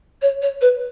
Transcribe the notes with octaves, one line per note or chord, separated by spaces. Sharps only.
C#5
C#5
B4